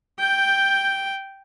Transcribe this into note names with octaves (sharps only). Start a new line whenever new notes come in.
G5 G6